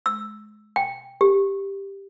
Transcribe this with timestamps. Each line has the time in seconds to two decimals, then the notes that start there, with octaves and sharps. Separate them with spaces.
0.06 E6
0.76 G5
1.21 G4